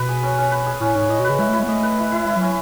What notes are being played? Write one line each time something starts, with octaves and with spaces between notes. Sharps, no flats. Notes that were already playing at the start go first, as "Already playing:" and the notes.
Already playing: B2 B4
G#4
C#4
C#4
B4
G#4
A2 C#4
G#2 C#4
A2 D#5
B2
B4
C#3
G#3 E4
A3
E4
G#3
B3
A3 D#5
B4
E4
E4
G#3 E4
F#3
C#4